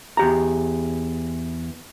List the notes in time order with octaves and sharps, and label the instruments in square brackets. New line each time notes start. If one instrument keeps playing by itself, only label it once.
[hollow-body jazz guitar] E2 G4 A#5